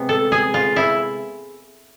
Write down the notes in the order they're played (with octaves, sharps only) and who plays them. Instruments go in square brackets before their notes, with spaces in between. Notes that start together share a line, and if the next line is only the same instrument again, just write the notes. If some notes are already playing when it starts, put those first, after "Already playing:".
Already playing: [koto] C3 G#3 B3
A4
G#4
F4
E4